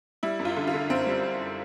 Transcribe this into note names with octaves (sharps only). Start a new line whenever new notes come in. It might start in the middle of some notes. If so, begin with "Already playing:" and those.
G3 E4
F#2
F4
D3
F4
D3
F#2 C4
G3